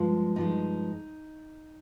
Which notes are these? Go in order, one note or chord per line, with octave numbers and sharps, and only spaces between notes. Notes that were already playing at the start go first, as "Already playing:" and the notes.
Already playing: G2 F3 G#3 F4
G2 F3 G#3 D#4